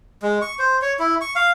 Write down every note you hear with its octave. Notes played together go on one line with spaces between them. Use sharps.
G#3
C#6
C5
C#5
E4
C#6
F5